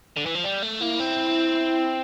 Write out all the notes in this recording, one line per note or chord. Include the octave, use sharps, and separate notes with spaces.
D3
E3
F3
G3
A3
A#3 E4
C4